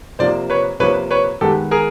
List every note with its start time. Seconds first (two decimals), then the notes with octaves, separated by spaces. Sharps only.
0.19 C3 F3 A#3 C5 D5
0.50 B4 C#5
0.80 C3 F3 A#3 B4 C#5
1.11 B4 C#5
1.41 D#3 G#3 B3 G4 A4
1.71 G#4 A#4